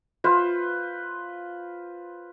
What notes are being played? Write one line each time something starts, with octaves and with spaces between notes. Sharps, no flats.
F4 B4 C5